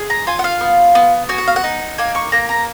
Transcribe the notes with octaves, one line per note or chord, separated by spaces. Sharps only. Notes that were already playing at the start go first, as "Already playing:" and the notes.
Already playing: G#4
A#5
F4 G#5
F#5
F5
B3
B3
F#4 G#5
F#5
F5
F#5
D#4
A#3 G#5
C#6
A#3 A#5
A#5